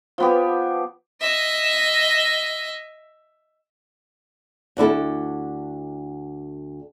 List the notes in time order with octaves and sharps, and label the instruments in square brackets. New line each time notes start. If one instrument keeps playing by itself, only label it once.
[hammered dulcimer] F3 B3 G4
[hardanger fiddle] D#5 E5
[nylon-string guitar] D2 D4 E4 A4